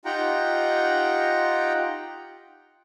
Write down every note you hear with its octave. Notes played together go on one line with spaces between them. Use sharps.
D#4 F4 G4 F#5 G5 A#5